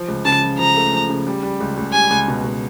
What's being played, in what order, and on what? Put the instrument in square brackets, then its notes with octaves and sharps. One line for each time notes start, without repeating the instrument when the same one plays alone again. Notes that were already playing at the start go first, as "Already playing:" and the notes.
Already playing: [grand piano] F3
C#2
[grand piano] C#3 [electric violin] A5
[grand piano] F3
[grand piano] F3 [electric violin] A#5
[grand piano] A3
F3
C#3
G3
G3
C#2
C#2
[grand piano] G3 [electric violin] G#5
[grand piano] C#2
B2
B2